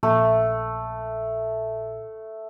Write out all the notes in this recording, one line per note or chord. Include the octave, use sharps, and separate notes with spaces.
A#1 A3